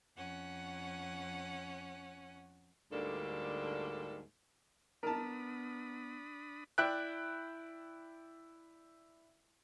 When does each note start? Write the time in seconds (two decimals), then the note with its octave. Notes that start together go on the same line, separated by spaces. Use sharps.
0.16 F2 C#4 F#5
2.91 D2 G#2 D3 G3 A#3 A4
5.03 B3 D4 A#4 A5 B5 D#6
6.78 E4 D5 E5 G5 F#6